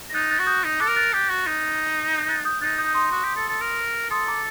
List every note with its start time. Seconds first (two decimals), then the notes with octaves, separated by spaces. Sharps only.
0.10 A#6
0.14 D#4 F#6 A6
0.30 F#6 A6
0.39 F#4
0.46 D#6 G6
0.64 D#4
0.80 A4 D6 F#6
0.88 A#4
0.96 F#6 A6
1.13 G4
1.30 F#4
1.46 D#4
2.13 G6 A#6
2.29 F#6 A6
2.45 D#6 G6
2.61 D#4 F#6 A6
2.78 D#6 G6
2.94 C6 D#6
3.12 F#4
3.24 G4
3.36 A4
3.49 A4
3.61 A#4
4.10 A4 C6 D#6
4.28 A#5 D6